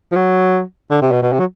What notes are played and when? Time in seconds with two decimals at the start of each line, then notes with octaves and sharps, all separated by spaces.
0.12 F3
0.16 F#3
0.90 D3
1.01 C3
1.12 B2
1.22 B2
1.33 C3
1.39 F#3